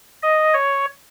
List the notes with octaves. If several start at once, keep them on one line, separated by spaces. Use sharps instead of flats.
D#5
C#5